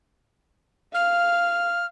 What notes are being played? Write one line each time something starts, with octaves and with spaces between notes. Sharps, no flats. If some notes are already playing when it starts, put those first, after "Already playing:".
F5 F6